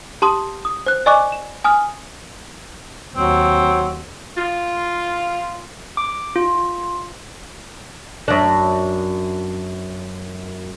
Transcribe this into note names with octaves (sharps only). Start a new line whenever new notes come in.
G4 A5 C6 D#6
D#6
C5 F#6
D5 D#5 G#5 C#6 D6 F#6
E7
G#5 D#6 F6
D#2 F#3 C4
F4
D6
F4
F#2 D4